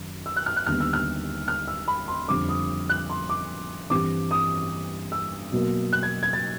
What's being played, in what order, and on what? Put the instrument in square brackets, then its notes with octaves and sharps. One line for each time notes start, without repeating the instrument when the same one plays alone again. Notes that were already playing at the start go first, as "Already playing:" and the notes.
Already playing: [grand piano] F#2 D#3
E6
F#6
F6
F#6
D#2 D3 G3 B3 F6
E6
F6
F6
E6
B5
C6
F2 D3 G3 C4 D6
D#6
F#6
C6
D6
G2 E3 G3 C4 D6
D#6
E6
B2 F#3 A#3
F#6
G#6
G#6
A6